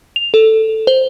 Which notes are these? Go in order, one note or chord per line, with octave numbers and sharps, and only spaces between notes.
F7
A4
C5